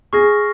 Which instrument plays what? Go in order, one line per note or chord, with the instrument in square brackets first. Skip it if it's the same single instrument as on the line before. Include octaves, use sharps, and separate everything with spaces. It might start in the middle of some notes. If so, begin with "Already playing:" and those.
[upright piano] G#4 [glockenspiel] C#6 F6 A#6